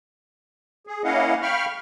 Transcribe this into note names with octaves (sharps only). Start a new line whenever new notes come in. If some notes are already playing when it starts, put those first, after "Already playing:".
G#4
A#3 C#4 E4 D#5 F5 F#5
F5 G5 B5 C#6 F6